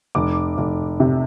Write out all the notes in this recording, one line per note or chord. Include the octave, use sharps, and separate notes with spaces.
F1 D6
F1
C3